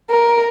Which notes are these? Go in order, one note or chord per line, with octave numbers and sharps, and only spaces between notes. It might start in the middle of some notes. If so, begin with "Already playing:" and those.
A#4